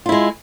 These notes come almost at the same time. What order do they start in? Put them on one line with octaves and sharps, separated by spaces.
F4 E4 G#3